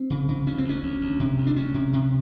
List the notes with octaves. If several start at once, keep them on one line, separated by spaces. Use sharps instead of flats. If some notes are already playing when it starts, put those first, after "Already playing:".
Already playing: C4
C#3
C#3
D2 C#4
C4
D2
C#4
D2
D2
C3
D2
D4
D2 C#4
C3
C3